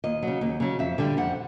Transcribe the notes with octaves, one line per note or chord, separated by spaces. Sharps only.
D#2 D#5
C#3 F#3
D#2
C#3 F#3
F2 E5
D3 G3
F2 F#5